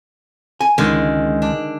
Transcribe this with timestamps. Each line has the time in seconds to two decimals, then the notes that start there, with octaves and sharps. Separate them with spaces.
0.61 G#5
0.78 C#2 D3 D#3 G#3
1.42 D4